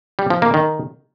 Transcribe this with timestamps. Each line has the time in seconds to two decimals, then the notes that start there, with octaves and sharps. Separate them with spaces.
0.19 G3
0.30 F3
0.42 A#3
0.54 D#3